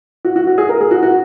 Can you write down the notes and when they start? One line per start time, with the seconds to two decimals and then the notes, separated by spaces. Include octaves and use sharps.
0.25 F#4
0.36 F#4
0.47 F#4
0.58 G#4
0.69 A#4
0.81 G#4
0.91 F#4
1.03 F#4